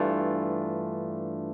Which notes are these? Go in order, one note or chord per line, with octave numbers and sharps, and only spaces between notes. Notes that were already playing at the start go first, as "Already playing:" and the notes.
Already playing: G2 E3 A3 D4 F4